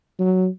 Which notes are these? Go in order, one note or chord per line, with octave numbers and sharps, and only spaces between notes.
F#3